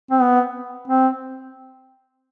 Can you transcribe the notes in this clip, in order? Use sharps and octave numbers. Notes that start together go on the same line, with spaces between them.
C4
B3
C4